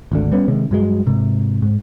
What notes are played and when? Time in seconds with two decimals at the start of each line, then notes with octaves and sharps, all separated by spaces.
0.12 G#1 D2 D3
0.32 G3 B3 C#4
0.48 C3 D#3 G#3
0.71 G2 F#3 G#3
1.07 G#2 C3
1.62 G#2